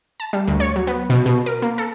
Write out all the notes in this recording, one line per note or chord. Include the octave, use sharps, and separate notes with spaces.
A5
G3
D2
C#5
F#3
B3
B2
B2
A#4
A#3
A4